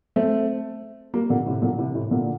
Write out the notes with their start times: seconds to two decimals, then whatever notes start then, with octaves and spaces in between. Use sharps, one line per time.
0.16 A3 C4
1.14 G3 A#3
1.30 A#2 D3
1.46 A2 C3
1.62 A#2 D3
1.78 C3 E3
1.95 A2 C3
2.11 A#2 D3